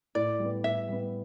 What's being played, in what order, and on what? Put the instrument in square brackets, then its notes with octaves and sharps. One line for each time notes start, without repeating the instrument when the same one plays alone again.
[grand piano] A2 [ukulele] D5
[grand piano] G3 B3
[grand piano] A2 [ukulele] E5
[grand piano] G3 B3